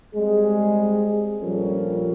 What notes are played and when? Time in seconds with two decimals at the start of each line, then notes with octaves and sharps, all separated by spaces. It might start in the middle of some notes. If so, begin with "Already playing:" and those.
0.15 G3 G#3 C4 G#4
1.42 A#1 F3 G3 C#4 A4 A#4